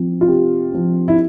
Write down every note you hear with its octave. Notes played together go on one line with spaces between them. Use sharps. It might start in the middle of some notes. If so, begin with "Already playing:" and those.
Already playing: F3 C4
F4
C3 G4
F3 C4
E4